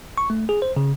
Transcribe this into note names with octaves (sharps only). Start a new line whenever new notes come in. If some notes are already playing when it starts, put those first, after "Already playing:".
C#6
A3
G#4
C5
C#3